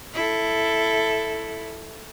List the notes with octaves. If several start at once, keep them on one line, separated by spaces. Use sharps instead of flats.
E4 A4